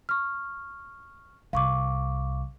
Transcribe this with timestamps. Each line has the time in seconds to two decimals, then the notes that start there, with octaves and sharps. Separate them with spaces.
0.09 C#6 F6
1.53 C2 F5 C#6 D6